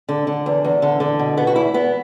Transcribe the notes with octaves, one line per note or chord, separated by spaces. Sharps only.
D3
D3
E2
E2
D3
D3
B2
B2 B3
F#4
E2 E4
E2 B3